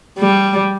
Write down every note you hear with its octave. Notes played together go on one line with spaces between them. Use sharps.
G3